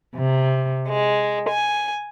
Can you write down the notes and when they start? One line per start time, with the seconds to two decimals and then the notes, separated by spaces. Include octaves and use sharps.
0.16 C3
0.88 G#3
1.49 G#5